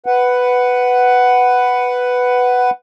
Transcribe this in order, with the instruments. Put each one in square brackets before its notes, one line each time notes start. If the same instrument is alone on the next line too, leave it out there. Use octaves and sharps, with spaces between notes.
[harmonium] B4 F#5